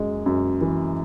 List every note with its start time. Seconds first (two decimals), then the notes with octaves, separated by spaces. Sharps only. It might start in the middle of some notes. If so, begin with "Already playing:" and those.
Already playing: F#2 G#3
0.26 F#2
0.61 E3